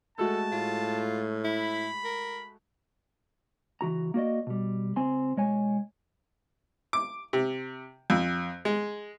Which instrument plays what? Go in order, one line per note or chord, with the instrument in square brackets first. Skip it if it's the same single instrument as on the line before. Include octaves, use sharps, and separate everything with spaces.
[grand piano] G#3 A3 F#4 [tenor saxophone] A4 [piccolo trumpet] A5
[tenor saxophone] A2 [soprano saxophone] F4
[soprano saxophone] E4 [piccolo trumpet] B5
[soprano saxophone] A#4
[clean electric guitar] C#2 E3 F#4 A#5
A#3 F#4 D5 D#5
B2 G3
C#2 C4 G#5 C6
B1 G#3 C#5 G#5
[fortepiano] D6
C3
F2
G#3